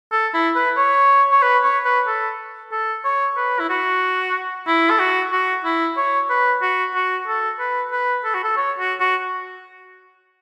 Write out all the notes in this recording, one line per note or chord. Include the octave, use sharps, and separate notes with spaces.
A4
E4
B4
C#5
C#5
B4
C#5
B4
A4
A4
C#5
B4
E4
F#4
E4
A4
F#4
F#4
E4
C#5
B4
F#4
F#4
A4
B4
B4
A4
F#4
A4
C#5
F#4
F#4